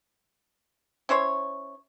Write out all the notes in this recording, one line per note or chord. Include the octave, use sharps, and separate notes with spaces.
C#4 E4 C5 C#5